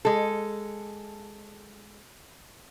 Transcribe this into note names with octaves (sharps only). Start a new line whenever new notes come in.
G#3 A4